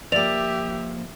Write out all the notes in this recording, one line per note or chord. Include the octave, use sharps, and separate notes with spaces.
F3 A#3 G4 D5 E5 F7